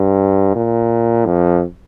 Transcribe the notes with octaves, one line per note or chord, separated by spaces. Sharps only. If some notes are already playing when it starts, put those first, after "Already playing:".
Already playing: G2
A#2
F2